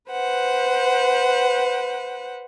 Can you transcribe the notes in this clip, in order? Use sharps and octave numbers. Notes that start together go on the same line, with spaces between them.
B4 C5 F#5